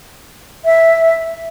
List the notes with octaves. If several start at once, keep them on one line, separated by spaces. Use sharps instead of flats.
E5